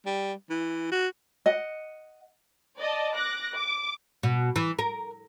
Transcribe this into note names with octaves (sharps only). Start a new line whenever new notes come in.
G3
E3
F#4
D#5 F#5
D5 D#5 A5
D6 F#6 A#6
D6
B2
E3
A#4